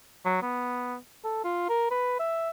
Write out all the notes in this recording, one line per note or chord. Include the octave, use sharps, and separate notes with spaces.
F#3
B3
A4
F4
A#4
B4
E5